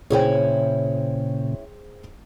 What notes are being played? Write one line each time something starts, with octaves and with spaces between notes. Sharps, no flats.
A#2 C#3 C#4 E4 G#4 C5 C#5 G5